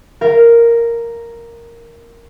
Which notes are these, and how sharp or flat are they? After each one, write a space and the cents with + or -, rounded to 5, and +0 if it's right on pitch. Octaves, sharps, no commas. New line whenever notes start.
A#4 +0 F5 -20